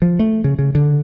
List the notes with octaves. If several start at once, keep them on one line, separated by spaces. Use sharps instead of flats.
F3
A3
C#3
C#3
D3